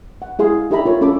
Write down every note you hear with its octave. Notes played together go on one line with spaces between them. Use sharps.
F#5
E4 G#4 F5 C6
D#4 G4 A4 E5 A#5 B5
F4 A#4 C#5
C#4 A4 C#5 B5 D6